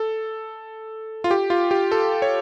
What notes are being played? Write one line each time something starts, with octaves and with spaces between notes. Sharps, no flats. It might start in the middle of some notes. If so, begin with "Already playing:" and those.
Already playing: A4
F4
G4
F4
G4
A4
C#5